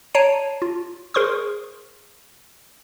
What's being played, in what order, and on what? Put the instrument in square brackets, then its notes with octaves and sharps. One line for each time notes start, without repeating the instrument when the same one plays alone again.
[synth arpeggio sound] C#5 A5 A#5 C7 D7 D#7
F4
G#4 A#4 C5 C6 C#6 D#6